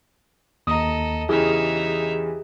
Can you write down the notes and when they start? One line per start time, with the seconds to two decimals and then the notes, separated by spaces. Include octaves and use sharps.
0.67 D#2 A4 D#5 A#5 D#6
1.29 E2 C#3 E3 D#4 G4 G#4 E5